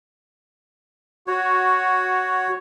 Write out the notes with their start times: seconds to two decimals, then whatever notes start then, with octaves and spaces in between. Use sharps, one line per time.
1.27 F#4 C#5